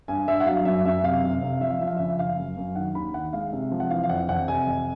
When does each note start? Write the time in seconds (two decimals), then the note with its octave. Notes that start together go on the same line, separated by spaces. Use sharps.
0.08 G2 G#5
0.28 G2 E5
0.40 F#5
0.46 F#3 F5
0.65 F#2 E5
0.85 F#2 E5
1.04 C3 F5
1.23 F1
1.42 C3
1.61 F3 E5
1.70 F5
1.79 F3 E5
1.87 F5
1.97 C#3 E5
2.19 F#1 F5
2.38 F#2
2.57 F#2
2.76 D#3 F#5
2.95 D#2 B5
3.14 D#3 F#5
3.33 G#3 F5
3.53 C3
3.72 F3
3.80 F#5
3.90 E3 F5
4.03 F5
4.09 F2 F#5
4.29 F2 F#5
4.48 C3 G#5
4.67 F2